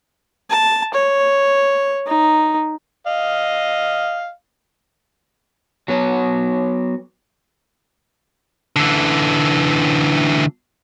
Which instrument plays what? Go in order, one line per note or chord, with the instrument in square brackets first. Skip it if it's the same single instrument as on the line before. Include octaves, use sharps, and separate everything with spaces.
[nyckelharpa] A5
C#5
D#4
[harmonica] D#5 F5
[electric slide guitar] F#3 B3 C#5
[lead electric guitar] D3 E3